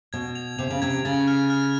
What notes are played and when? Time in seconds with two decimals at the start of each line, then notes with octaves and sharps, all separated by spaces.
0.13 B2 G#6
0.35 F7
0.59 C3 F7
0.71 C#3
0.82 C3 G#6
1.05 C#3 A6
1.27 F6
1.50 F6